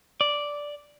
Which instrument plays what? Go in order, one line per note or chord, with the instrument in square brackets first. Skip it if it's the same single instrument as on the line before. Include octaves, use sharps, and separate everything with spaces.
[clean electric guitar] D5